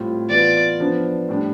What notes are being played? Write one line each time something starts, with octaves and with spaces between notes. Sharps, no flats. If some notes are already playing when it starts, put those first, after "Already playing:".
Already playing: A2 G3 C4 F4
E3 B3 F4 D5
F3 B3 D4
A2 G3 D4